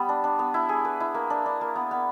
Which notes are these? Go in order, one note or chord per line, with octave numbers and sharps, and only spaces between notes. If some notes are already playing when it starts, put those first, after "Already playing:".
Already playing: G3 B3
D4
D4
B3
E4
G#4
B4
E4
A#3
D4
D4
A#3
B3
B3